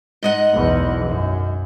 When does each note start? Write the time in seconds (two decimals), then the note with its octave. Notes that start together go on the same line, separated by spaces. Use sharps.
0.23 G#2 D#5 F#5
0.54 B1 E2
1.06 F#2